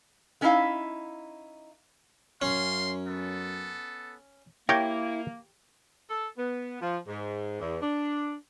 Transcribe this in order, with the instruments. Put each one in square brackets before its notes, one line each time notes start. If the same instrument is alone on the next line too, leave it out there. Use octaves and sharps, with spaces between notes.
[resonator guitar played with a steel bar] A3 C#4 D#4 E4 E5 F5
[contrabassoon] F#2 [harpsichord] C#4 [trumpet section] F5 C6
[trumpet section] B3 A4
[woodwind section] A#3 [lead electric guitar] E4 [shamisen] G4 [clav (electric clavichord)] A#4 C#5 G5
[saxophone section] A4
B3
F3
G#2
E2
D4